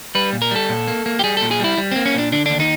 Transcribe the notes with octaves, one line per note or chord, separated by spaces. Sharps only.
G3 B4
A#2
A#4
G3 A4
A#2
A#3
A#3
G4
G3 G#4
A#2 A4
G#4
G3 E4
G3
A#3 C4
C#4
A#2 D4
D3 D4
D#2 D4
D#4